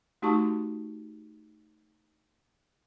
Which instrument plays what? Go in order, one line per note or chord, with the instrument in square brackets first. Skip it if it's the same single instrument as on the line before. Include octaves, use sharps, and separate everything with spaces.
[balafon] A3 D#4 F#4 G4 A5 C#6